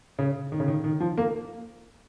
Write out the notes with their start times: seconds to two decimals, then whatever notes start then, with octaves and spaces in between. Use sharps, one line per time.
0.19 C#3
0.52 D#3
0.60 C#3
0.68 D#3
0.84 D#3
1.00 F3
1.17 A#3